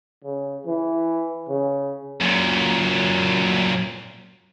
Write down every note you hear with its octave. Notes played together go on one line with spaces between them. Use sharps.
C#3
E3
C#3
F#2 A#2